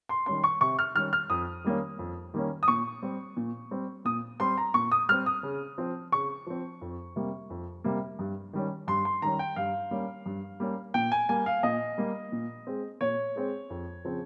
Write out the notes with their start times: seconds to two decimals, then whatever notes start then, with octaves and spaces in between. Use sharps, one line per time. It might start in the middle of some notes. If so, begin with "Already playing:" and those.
0.09 C6
0.26 D#3 G3 C#4 C6
0.44 C#6
0.61 C3 C#6
0.79 F6
0.95 D#3 G3 C#4 F6
1.13 F6
1.30 F2 D#6
1.64 D#3 G3 A#3 C#4
1.99 F2
2.34 D#3 G3 A#3 C#4
2.63 D#6
2.68 A#2 C#6
3.02 G3 C4
3.37 A#2
3.71 G3 C4
4.05 A#2 D#6
4.40 G3 C4 C6
4.58 A#5
4.74 A#2 C#6
4.92 D#6
5.09 G3 C4 F6
5.26 D#6
5.43 C#3
5.78 F3 C4
6.12 C#3 C#6
6.47 F3 C4
6.82 F2
7.16 C3 G3 A#3
7.50 F2
7.84 C3 G3 A#3
8.19 G2
8.53 D#3 G3 C#4
8.88 G2 C6
9.05 C6
9.22 D#3 G3 C#4 A#5
9.39 G5
9.56 G2 F5
9.91 G3 A#3 C#4
10.26 G2
10.60 G3 A#3 C#4
10.94 A#2 G5
11.12 G#5
11.29 G3 A#3 G#5
11.46 F5
11.63 A#2 D#5
11.98 G3 A#3
12.32 A#2
12.67 G#3 C4
13.01 A#2 C#5
13.36 G#3 C4
13.70 F2
14.05 C#3 F3 C4